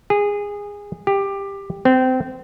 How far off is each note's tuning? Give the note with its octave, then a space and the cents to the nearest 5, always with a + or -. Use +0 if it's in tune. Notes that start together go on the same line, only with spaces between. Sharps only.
G#4 -20
G4 +15
C4 -25